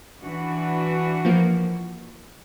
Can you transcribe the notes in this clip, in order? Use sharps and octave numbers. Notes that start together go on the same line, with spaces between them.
E3 D4 F#4
F3 A#3